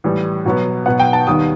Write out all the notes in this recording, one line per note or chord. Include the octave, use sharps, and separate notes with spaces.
A2 E3 G3
B2 F#3 B3
B2 F#3 B3 F#5
G5
A5
D#2 D#3 G3 B3 D#6